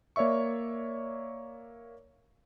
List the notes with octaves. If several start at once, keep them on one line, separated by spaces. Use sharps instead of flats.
A#3 C#5 D5 E5 C#6